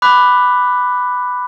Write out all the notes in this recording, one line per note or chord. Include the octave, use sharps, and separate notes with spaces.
B5 D6 F#6 B6